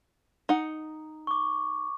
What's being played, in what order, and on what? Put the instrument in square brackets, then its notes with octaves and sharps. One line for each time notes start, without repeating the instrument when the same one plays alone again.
[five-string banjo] D#4 F#5
[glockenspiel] C#6 D6